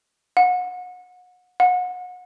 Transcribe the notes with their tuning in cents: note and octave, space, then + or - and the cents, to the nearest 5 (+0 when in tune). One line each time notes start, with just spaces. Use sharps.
F#5 -30
F#5 -30